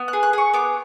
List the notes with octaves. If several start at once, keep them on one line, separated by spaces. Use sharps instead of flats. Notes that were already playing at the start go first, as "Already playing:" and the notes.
Already playing: B3
F#6
G#4
F#6
G#4 C#6
B3 D6